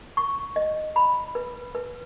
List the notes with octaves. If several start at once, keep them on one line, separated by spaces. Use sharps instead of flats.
C#6
D#5
B5
B4
B4